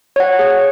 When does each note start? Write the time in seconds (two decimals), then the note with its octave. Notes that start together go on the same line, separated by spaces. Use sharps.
0.16 C#5 F#5
0.39 G#4